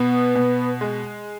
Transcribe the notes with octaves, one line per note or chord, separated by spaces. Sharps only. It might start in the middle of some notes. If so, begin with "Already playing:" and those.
Already playing: B2 B3
B2
G#3